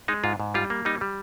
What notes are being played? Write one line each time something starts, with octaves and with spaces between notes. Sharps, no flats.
G#3 D#4
G#2 F4
G#2
G3 F4
A#3
G3 D#4
G3